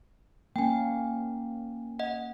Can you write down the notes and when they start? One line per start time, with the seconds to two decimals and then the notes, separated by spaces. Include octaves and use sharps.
0.56 A#3 C#4 G5 G#5
1.99 D#5 F#5